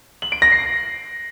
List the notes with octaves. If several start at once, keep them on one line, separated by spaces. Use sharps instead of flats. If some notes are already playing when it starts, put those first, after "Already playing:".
F#7
D7
A#6
C7